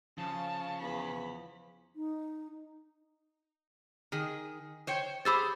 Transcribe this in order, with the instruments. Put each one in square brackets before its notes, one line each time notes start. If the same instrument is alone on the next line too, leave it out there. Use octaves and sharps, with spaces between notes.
[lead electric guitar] C#3 [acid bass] F3 [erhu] A5
[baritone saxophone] E2 [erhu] B5
[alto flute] D#4
[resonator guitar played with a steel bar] D#3 G#4
C5 C#5 G5
[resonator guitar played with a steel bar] G4 G#4 C5 [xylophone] B5 E6 A6